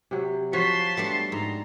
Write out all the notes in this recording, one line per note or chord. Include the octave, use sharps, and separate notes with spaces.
C3 F#3
F3 F#4 C5 C#5 A5 C6 B6
G3 A3 B3 D4
G#2 A#5